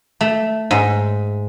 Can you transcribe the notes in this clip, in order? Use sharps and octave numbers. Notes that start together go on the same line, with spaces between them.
A3
G#2